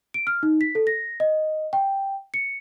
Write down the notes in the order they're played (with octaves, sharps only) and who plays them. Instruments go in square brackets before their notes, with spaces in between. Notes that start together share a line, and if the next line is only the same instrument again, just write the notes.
[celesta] D7
F6
D#4
B6
A4
A#6
D#5
G5
C#7